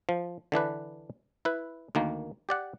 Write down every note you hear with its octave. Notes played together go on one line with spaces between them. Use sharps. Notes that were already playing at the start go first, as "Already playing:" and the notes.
F3
D3 E3 D4 B4
E4 B4
D2 D#3 A#3
G4 D5 F#5